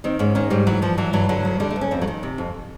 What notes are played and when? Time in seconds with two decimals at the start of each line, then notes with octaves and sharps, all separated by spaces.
0.04 D#3 C4
0.19 G#2 C#4
0.35 D#3 C#4
0.50 G#2 G3
0.67 E3 F#3
0.82 G2 F3
0.98 E3 F#3
1.13 G2 F#3
1.29 D3 F#3
1.45 D2
1.60 D3 G3
1.70 A3
1.76 D2
1.81 C#4
1.91 F2 C4
2.02 F#3
2.07 D#3
2.23 C3
2.38 F2